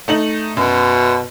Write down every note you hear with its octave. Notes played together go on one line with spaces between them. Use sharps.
A3 D#4 F#7
F#2 B2